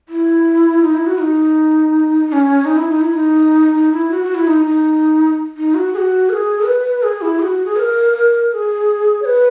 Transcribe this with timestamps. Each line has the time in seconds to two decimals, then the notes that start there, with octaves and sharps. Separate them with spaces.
0.09 E4
0.82 D#4
0.94 E4
1.07 F#4
1.18 D#4
2.28 D#4
2.32 C#4
2.65 D#4
2.76 E4
2.89 D#4
3.01 E4
3.13 D#4
3.74 D#4
3.92 E4
4.11 F#4
4.22 F#4
4.35 E4
4.47 D#4
4.65 D#4
5.57 D#4
5.74 F#4
5.93 G#4
5.97 F#4
6.29 A#4
6.33 G#4
6.66 B4
7.03 G#4
7.21 E4
7.39 G#4
7.42 F#4
7.65 G#4
7.76 B4
7.79 A#4
8.12 A#4
8.49 A#4
8.54 G#4
9.22 C#5
9.25 B4